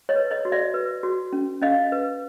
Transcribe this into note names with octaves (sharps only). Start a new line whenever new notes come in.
C#5 D#5
B4
C#5 D#5
F#4
D5 E5
B4
F#4
C#4
C#4 D#5 F5
B4